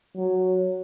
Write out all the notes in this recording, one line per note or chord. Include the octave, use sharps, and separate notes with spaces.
F#3